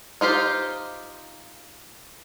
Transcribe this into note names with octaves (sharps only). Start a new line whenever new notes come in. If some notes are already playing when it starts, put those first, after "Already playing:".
D#4 F4 G4 C5